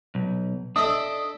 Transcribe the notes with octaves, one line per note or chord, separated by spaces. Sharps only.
B1
D4 A4 D#5 E5 D#6